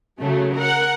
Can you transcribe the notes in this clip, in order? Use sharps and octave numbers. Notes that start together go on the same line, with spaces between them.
C#3 F#3 A3
A#4 F#5